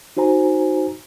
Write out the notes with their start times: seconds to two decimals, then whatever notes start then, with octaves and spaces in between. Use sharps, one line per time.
0.17 D#4 F#4 C5 G#5 A#5